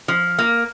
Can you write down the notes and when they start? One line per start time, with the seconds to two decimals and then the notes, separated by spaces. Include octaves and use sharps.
0.08 F3
0.39 A#3